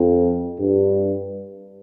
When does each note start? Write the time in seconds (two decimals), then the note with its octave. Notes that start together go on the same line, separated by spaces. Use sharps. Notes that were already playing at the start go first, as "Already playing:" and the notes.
Already playing: F2
0.59 G2